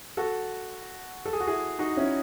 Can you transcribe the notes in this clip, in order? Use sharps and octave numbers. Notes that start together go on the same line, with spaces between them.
F#4 A4
A4
G#4
F#4
E4 G#4
D#4 F#4
C#4 E4